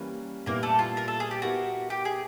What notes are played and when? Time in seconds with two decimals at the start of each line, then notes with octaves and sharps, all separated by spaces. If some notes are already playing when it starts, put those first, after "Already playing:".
Already playing: E3 G3 A#3 C#4 B4
0.46 A#2 G3 A#3 B3 E4 A#4
0.63 A3 A4
0.79 F4
0.97 A#4
1.08 A4
1.20 G#4
1.31 G4
1.42 B3 E4 F#4 G4 A#4
1.90 G4
2.05 G#4